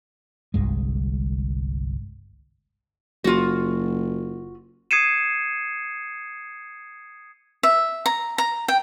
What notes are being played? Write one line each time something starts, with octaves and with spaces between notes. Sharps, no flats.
G1 C2 G2 G#3
F#1 F4 F#4
D#6 G#6 C7 C#7 D#7 E7
E5
A#5
A#5
G5